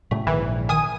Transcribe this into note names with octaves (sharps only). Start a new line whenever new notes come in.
A2 C#3 F#3 A3
A#1 G#2 D#3 E3
D#3 G#5 D#6 D#7